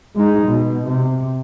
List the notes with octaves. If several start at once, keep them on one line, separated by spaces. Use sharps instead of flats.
G#3 D#4
B2
C3